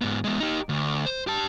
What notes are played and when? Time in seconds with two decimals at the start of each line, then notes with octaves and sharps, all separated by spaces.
0.01 G#2 B3
0.24 G#3 B3
0.40 D#4 G4
0.69 D2
1.06 C5
1.27 G4 A5